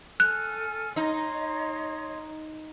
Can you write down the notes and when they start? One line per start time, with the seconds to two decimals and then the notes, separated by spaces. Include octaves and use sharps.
0.20 A4 G#5 F6 F#6
0.96 D#4 C#5 D#5 C6